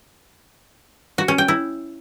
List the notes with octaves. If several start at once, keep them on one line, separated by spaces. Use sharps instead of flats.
F#4
C#4
G5
E4